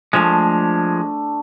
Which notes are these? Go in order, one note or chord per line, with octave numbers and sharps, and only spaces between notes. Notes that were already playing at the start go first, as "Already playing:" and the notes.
F3 G#3 A3 D4